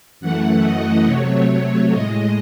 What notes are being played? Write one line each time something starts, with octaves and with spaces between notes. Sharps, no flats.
F#2 E3 A3 F#5
D#5
C3 F#3 A3 C#5
C#5
A2 G#3 D#5